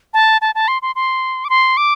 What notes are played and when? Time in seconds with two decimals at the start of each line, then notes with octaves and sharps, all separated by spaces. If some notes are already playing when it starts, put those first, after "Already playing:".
0.14 A5
0.41 A5
0.55 A5
0.68 C6
0.82 C6
0.95 C6
1.45 D6
1.50 C6
1.77 D6